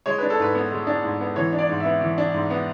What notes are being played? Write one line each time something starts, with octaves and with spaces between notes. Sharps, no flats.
G#3 C#5
D4 B4
A4
G#2 B4
B3
G#3
D4
G#2
B3
E3 C#5
D4
D5
G#2
B3 E5
E3
D4
G#2
B3